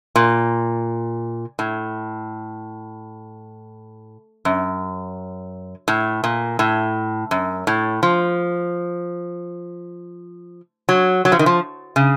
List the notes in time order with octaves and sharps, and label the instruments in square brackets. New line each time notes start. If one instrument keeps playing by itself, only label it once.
[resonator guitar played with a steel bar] A#2
A2
F#2
A2
A#2
A2
F#2
A2
F3
F#3
F#3
F3
D#3
F3
C#3